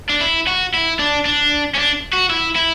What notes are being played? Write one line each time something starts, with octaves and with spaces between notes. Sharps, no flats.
D4
E4
F#4
E4
D4
D4
C#4
D4
F#4
E4
E4